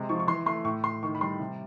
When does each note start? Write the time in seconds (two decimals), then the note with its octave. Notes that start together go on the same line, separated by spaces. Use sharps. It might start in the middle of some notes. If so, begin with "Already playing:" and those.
Already playing: C3 G#3
0.09 F3 C#6
0.20 C#6
0.27 E3 C6
0.46 A3 C6
0.64 A2 C#6
0.84 A2 C6
1.03 D#3 C#6
1.15 B5
1.21 G3 C6
1.40 C3